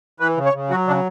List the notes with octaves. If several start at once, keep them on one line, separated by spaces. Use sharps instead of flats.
E3 B4
C#3
C#5
C#3
F#3 F#4
C#3 D4